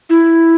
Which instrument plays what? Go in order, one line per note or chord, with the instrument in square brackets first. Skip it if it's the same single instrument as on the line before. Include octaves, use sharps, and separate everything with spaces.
[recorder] E4